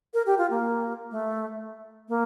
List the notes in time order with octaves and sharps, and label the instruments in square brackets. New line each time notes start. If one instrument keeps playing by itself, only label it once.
[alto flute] A#4
G4
F4
A#3
A3
A#3